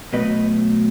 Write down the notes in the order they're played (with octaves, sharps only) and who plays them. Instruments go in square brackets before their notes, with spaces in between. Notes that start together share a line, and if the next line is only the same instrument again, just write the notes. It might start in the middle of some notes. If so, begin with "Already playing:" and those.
[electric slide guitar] B2 F#3 A3 B4 D#5